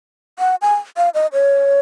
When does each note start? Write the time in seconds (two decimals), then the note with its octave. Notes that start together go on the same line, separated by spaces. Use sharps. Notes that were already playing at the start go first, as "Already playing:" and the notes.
0.39 F#5
0.62 G#5
0.97 F5
1.14 D#5
1.33 C#5